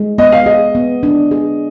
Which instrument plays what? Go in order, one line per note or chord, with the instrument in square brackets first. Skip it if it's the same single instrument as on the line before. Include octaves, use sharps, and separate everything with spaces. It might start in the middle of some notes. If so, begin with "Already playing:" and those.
Already playing: [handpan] G#3
[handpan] B3 [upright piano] D#5
[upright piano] F5
[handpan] G#4 [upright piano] D#5
[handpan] B3
D4
G#4